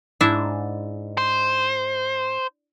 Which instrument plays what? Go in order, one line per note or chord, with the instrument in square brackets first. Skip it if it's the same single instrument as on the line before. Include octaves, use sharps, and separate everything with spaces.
[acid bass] G#2 [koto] D4 E4 E5
[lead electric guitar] C5